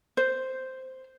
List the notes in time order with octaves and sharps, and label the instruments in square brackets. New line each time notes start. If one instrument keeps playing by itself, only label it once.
[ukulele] C5